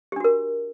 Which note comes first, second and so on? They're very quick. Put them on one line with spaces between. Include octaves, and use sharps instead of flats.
G4 D4 F#4 A#4